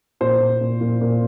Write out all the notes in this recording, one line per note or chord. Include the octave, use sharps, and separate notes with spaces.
A#2 C5
A#2
A#2
A#2
A#2